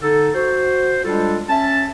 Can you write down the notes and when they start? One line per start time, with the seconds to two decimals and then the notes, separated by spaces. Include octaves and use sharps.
0.01 D3 D#4 A4
0.35 F#4 C5
1.05 G3 G#3 D4 F4 A4
1.49 C#4 E5 A5